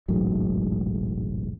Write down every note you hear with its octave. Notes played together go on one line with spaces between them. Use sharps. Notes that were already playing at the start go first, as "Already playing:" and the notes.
E1 A1 G#2 F#3